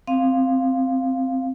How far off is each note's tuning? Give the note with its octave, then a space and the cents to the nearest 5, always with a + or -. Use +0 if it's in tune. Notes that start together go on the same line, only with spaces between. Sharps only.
C4 +0 F5 +0